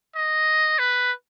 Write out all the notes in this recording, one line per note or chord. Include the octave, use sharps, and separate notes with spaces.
D#5
B4